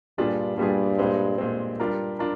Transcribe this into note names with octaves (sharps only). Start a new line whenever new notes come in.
G2 A#2 G3 D4 F4 G#4
G2 A#2 G3 D4 F4 G#4
A#2 G#3 C4
G2 A#2 G#3 C4
G3 D4 F4 A#4
D4 F4 A#4